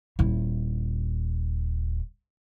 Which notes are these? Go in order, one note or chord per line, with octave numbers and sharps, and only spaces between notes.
D#1 E4